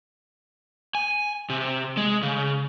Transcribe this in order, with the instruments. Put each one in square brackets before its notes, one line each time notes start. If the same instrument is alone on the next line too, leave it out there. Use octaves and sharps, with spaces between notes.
[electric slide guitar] G#5
C3
G#3
C#3